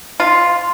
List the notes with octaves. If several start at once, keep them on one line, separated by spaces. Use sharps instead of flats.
F4